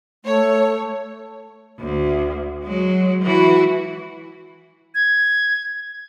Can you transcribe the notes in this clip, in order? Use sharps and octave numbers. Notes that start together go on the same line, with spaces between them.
A3 C#5
D2
F#3 G#3
E3 F#4
G#6